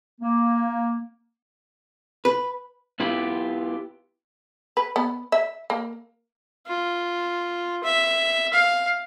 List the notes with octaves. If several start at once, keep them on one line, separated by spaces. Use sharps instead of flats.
A#3
B4
B3 E4 F4 G4
B4
B3
E5
A#3
F4
E5
F5